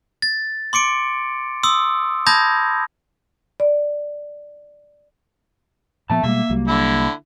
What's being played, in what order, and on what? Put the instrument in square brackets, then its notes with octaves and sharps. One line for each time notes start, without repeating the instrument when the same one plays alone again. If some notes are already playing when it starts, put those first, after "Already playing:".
[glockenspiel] A6
C6 D6 C#7 D7
C6 D#6 E6
A5 B5 D#6 G6 G#6 A#6
[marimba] D5
[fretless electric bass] A#2 F3 B3 [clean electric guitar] E5 A5
[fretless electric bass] B2 G3 G#3 [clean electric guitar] A#3 [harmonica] E5
[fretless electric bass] C2 F#3 G3
[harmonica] D3 E4